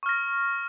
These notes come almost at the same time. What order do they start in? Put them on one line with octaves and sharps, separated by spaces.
C#6 F6 A#6